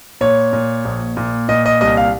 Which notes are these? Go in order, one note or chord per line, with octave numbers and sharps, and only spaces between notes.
A#2 C#5
A#2
A#1
A#2
A#2 D#5
D#5
C2 D#5
F5